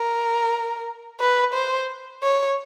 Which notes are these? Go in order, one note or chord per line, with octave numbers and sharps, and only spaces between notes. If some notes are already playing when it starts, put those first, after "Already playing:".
Already playing: A#4
B4
C5
C#5